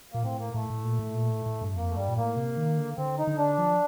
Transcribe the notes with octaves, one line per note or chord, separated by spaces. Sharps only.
A#2 A#3
A2 C4
A#3
A2 A3
A2
A#2
A2
A#2
A2
A2
G2
F2 A#3
A3
G2 G3
A#2
A2 A#3
C3
D#3
D3
D3 C4
D#4
D3
D4
F3